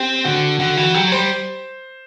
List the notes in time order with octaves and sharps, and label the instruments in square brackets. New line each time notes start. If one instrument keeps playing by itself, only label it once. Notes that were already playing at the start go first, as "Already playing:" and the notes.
Already playing: [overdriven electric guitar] C4 [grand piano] G4
[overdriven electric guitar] D3 [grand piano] F#4
[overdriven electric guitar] D3 [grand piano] F#4
[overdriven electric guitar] E3 [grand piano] F#4
[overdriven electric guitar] F#3 [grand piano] G4
[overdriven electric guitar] G3 [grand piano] C5